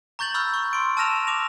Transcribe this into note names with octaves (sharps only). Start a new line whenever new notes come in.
A#5 C#6 G6 A6 F#7
B5 C#6 E6 F6 G6
C#6
C6 D7
A5 E6 F6 A#6 E7 F7
D6 A#6 F7